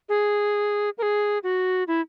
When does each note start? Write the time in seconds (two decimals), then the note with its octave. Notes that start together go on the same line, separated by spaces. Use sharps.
0.09 G#4
0.98 A#4
1.02 G#4
1.43 F#4
1.87 E4